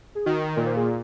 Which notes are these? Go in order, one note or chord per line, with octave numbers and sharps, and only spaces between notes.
G#4
D#3 F#4
A#2 A#4
C5
G#4